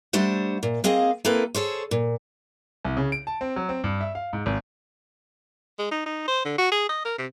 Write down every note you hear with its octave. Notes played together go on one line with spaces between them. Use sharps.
G3 A3 D4 C5 F#5
A#2
A#3 C4 G#4 D#5 F5
A#3 C4 E4 A4 B4
G#4 A4 C5 C#5
A#2
C2
C#3
D7
A5
C4
F#3
C4
G2
E5
F5
G#2
G#1
G#3
D#4
D#4
C5
D3
F#4
G#4
D#5
A#4
C3